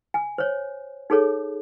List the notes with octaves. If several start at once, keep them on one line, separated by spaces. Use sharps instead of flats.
G#5
C5 C#5
D#4 G#4 A4 C#5